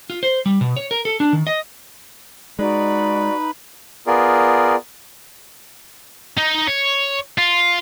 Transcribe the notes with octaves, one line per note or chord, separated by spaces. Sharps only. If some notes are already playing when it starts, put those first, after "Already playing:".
F4
C5
G3
B2
C#5
A#4
A4
D4
D#3
D#5
G#3 D#4 F#4 B4 D5 B5
B3 F4 G#4 A#4 D5
D#4
C#5
F4